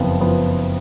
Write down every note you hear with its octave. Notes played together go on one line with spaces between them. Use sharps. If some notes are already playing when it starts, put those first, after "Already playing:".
Already playing: F#1 F2 F3 B3
F3 B3